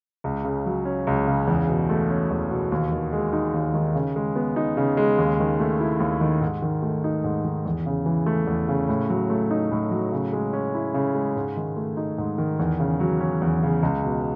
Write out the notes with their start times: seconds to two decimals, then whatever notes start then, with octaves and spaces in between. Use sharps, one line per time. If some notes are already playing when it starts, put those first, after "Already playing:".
0.24 C#2
0.45 C#3
0.66 F#3
0.85 C#4
1.07 C#2
1.28 C#3
1.47 E2
1.68 B2
1.90 A3
2.10 C#4
2.30 E2
2.51 B2
2.72 D#2
2.92 D#3
3.13 G#3
3.33 D#4
3.54 D#2
3.74 D#3
3.95 C#3
4.16 G#3
4.36 B3
4.56 D#4
4.77 C#3
4.97 G#3
5.18 D#2
5.39 D#3
5.60 A3
5.80 E4
6.00 D#2
6.21 D#3
6.41 G#2
6.62 D#3
6.82 A3
7.04 D#4
7.24 G#2
7.45 D#3
7.65 E2
7.86 C#3
8.06 E3
8.26 A3
8.47 E2
8.69 C#3
8.89 A2
9.10 F#3
9.30 A3
9.51 D#4
9.72 A2
9.91 F#3
10.12 C#3
10.33 G#3
10.53 C#4
10.74 E4
10.94 C#3
11.15 G#3
11.36 G#2
11.57 D#3
11.77 A3
11.97 D#4
12.18 G#2
12.38 D#3
12.59 E2
12.80 C#3
13.00 F#3
13.21 C#4
13.42 E2
13.63 C#3
13.83 C#2
14.04 B2